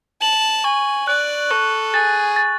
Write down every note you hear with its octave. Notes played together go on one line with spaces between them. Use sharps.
A5 F#7
G#5 C#6
D5 F#6
A4 C#6
G#4 A6
A6